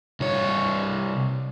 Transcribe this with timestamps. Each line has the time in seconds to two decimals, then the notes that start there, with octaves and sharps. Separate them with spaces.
0.20 C2 C#5